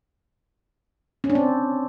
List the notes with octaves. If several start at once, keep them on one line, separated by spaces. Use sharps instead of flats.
C#4
D4
C4